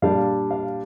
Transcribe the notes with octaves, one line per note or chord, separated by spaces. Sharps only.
A#2 G3 D4 F5
F5